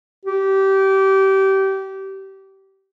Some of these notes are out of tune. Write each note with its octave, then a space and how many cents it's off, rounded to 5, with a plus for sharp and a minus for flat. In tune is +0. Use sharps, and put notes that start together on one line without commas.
G4 -25